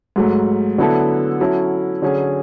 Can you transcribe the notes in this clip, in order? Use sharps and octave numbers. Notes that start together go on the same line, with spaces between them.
G#2 F#3 A3
D3 F#3 B3 E4 A4
F#3 C#4 E4 A4
D3 F#3 C#4 G#4